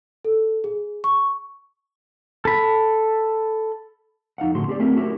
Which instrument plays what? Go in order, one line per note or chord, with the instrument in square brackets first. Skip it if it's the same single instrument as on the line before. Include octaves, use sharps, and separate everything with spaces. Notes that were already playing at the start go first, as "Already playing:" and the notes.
[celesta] A4
G#4
C#6
[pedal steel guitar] A4 B5
[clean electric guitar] F2 D#4 F5 F#5
A2 D3 F#4 G#4 C6
C#4 G4 G#4 D5
A3 C4 E4 G4 G#4 A#4
C#4 E4 F#4 G4 A#4